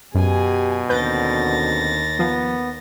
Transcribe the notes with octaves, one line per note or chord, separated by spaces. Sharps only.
F#2 B2 G4 G#4 G#5
D#2 D3 C4 F#4 B4 G6 A6 A#6
F3 B3